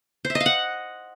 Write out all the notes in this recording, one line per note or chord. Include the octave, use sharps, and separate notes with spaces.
C5
E5
D#5
F5
F#5